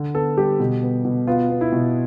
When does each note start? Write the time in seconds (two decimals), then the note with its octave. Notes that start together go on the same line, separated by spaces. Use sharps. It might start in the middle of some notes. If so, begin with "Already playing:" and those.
Already playing: D3
0.15 B3 A4
0.37 G3 G4
0.60 B2
0.83 B3
1.05 B2
1.27 B3 F4
1.49 B3
1.61 E4
1.72 B2